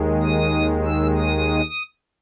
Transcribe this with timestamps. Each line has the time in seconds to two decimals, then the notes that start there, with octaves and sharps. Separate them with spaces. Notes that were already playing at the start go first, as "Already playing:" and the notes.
Already playing: D#2 D#3 G#3
0.22 D#6
0.85 E6
1.17 D#6